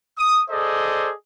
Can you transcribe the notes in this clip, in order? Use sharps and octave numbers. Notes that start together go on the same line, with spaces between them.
D#6
G#4 A4 C5 D5 D#5